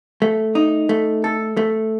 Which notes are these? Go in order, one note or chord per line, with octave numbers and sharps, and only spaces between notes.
A3
D#4
A3
A4
A3